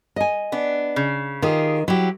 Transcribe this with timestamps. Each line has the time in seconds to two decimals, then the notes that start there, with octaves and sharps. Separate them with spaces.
0.16 D#5 G#5
0.52 B3 D4
0.96 C#3
1.42 D#3 F4 G4 G#4
1.88 F#3 E4 G4